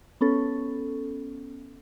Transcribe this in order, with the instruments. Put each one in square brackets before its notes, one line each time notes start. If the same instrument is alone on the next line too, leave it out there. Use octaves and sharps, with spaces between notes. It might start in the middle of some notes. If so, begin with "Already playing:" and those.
[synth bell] B3 C#4 A4